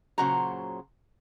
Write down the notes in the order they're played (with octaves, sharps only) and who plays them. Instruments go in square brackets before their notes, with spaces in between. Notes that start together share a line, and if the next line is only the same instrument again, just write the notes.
[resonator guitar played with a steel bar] A#2 C#3 F#3 F#4 C5 A#5